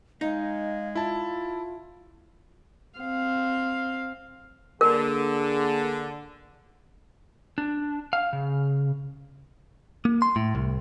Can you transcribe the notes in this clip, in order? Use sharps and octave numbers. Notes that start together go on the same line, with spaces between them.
G#3 D#4 F5
E4 F4 A5
C4 F5
D3 A#3 G#4 A#4
D4
F5
C#3
A#3
C6
A2
C2